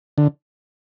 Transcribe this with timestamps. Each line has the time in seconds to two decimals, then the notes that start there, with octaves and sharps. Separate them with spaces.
0.18 D3